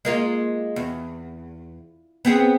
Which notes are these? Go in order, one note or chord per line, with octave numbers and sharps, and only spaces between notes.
G#3 A#3 F4
E2
B3 C4 G#4